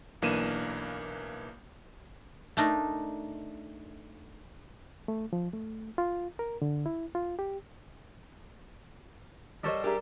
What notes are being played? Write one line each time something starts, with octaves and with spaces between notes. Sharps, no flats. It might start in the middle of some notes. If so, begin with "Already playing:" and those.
B1 E3 A#3 D4 D#7 E7
A3 D4 D#4 A#4
A3
F3
A3
F4
A#4
D3
E4
F4
G4
G3 A4 A#4 C5 C#5 D#5
D4 G4 G#4 A#4 D5 E5 A#5